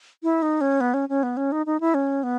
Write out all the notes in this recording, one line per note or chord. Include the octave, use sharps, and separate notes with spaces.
E4
D#4
C#4
B3
C#4
C#4
B3
C#4
D#4
D#4
E4
C#4
B3